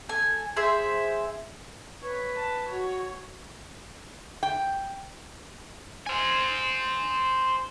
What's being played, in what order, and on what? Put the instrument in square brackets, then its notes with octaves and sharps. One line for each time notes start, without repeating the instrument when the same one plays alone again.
[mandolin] A4 G#5
G#4 C5 E5
[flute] B4 [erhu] C#5
[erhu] A5
[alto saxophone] F#4 [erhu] C#5
[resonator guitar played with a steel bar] G5
[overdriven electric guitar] C5 G#5